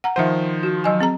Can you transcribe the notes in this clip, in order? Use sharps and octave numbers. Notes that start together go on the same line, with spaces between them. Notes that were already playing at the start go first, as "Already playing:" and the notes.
F#5 A#5
D#3 F3 C5 E5 F#5
F#4
F#3 D#5 G#5
C4 G#4 A#5